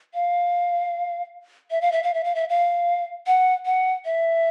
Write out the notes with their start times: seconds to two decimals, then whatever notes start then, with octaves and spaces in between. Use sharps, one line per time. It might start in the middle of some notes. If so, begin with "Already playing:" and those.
0.14 F5
1.71 E5
1.81 F5
1.92 E5
2.03 F5
2.14 E5
2.24 F5
2.35 E5
2.49 F5
3.27 F#5
3.66 F#5
4.05 E5